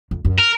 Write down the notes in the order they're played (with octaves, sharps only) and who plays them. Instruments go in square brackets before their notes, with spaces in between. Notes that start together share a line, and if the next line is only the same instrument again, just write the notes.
[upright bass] F2
F#2
[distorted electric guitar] A#4